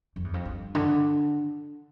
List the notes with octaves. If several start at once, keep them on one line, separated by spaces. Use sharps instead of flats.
F2
E2
F2
G2
D3